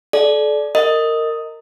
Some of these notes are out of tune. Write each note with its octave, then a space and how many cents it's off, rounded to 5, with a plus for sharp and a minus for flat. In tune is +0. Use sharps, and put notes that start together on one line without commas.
A4 -35 D5 +0
A#4 -20 D#5 +0